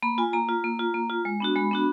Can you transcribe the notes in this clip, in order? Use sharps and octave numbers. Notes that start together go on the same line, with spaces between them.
A#3 B5
F4 G#5
A#3 A#5
F4
A#3
F4
A#3
F4
G#3
B3 D4 F#4
G#3 B5
B3 D4 F#4